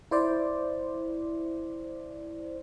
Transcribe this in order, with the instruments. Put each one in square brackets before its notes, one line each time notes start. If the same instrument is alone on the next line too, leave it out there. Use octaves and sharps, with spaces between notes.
[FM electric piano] E4 C5 D5